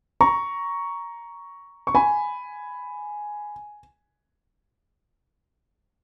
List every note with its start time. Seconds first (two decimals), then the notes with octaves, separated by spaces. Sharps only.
0.21 A#5 C#6
1.87 C#6
1.95 G#5 B5